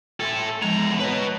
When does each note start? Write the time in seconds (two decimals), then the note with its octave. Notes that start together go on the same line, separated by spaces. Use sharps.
0.20 E4 A4 G5 G#5 C6
0.62 E2 F3 G#3 A#5
0.99 B4 C#5 D#5 A5